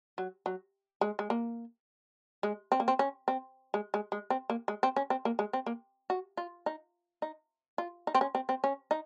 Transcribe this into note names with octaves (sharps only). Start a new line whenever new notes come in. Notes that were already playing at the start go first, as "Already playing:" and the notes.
F#3
F#3
G#3
G#3
A#3
G#3
C4
A#3
C4
C#4
C4
G#3
G#3
G#3
C4
A#3
G#3
C4
C#4
C4
A#3
G#3
C4
A#3
F#4
F4
D#4
D#4
F4
D#4
C4
C#4
C4
C4
C#4
D#4